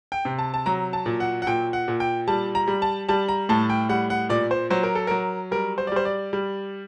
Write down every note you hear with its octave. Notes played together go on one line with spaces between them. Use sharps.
G5
C3
A5
A5
F#3 A#5
A5
A#2
F#5
F#5
A#2 G5
F#5
A#2
G5
G3 A5
A#5
G3
A5
G3 A5
A#5
A2 A5
G5
G3 F#5
F#5
A#2 D5
C5
F#3 C5
A#4
A4
F#3 A#4
G3 A#4
C5
D5
G3 C5
D5
G3